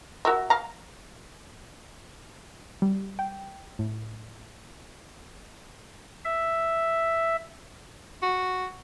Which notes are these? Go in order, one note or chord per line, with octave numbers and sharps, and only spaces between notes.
F#4 A#4 E5
F5 A#5
G3
G5
A2
E5
F#4